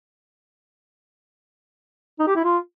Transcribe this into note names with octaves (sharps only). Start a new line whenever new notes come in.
D#4
G4
E4
F4